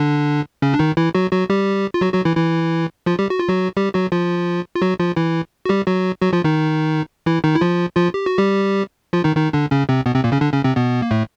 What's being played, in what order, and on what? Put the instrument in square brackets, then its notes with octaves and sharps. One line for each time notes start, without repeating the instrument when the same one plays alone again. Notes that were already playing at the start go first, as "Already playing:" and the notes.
Already playing: [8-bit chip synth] D3 D4
C#3 C#4
D4
D#3 D#4
E3 E4
F#3 F#4
F#3 F#4
G3 G4
F4
F#3 F#4
F#3 F#4
E3 E4
E3 E4
F3 F4
G3 G4
F#4
F4
F#3 F#4
G3 G4
F#3 F#4
F3 F4
F4
F#3 F#4
F3 F4
E3 E4
F#4
G3 G4
F#3 F#4
F#3 F#4
F3 F4
D#3 D#4
E3 E4
D#3 D#4
E4
F3 F4
F3 F4
G4
F#4
G3 G4
F3 F4
D#3 D#4
D#3 D#4
D3 D4
C#3 C#4
C3 C4
B2 B3
C3 C4
A#2 A#3
C#3 C#4
D3 D4
C#3 C#4
C3 C4
B2 B3
A#3
A2 A3